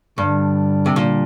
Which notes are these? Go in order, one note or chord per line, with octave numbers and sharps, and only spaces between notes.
G2 D3 G3 D4
C3
A#2